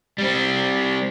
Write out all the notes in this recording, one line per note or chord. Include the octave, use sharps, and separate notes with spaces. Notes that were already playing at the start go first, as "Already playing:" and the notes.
G3 C4